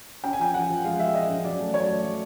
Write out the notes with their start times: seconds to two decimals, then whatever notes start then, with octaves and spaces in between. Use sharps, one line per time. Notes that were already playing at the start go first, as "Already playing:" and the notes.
0.24 C#4 G5
0.33 G#5
0.39 F3 G5
0.54 F3 F#5
0.69 F3
0.85 G#3 F5
0.99 G#3 E5
1.14 F3 D#5
1.29 C#4
1.45 F#3 D5
1.59 A3
1.74 F#3 C#5
1.89 A3
2.05 F#3